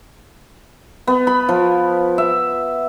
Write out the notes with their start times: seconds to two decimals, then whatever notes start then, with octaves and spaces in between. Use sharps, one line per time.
1.07 B3
1.27 B5
1.49 F3
2.18 E5